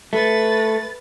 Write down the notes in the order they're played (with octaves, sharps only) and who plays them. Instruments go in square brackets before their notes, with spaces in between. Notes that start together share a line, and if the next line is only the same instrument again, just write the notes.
[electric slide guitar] A3 [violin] B4 A6